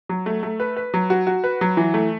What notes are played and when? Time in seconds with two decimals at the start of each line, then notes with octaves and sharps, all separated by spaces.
0.09 F#3
0.26 A3
0.43 A3
0.60 B4
0.77 B4
0.94 F#3
1.10 F#4
1.27 F#4
1.44 B4
1.61 F#3
1.77 E3
1.94 A3